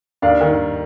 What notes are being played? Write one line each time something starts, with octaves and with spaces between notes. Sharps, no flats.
D#2 D5 F5
D#3